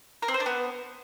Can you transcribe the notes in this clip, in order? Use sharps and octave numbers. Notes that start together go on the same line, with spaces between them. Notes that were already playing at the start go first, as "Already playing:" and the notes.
A#4
C4
C5
D4
B3